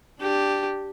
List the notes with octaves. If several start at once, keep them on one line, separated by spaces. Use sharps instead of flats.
D4 G4